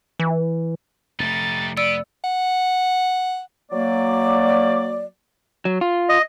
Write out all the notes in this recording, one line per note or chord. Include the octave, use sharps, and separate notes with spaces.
E3
F1 G3 A3 D#4 A6
B3 D5 E6 D7
F#5
F#3 A#3 D5
F#3
F4
D#5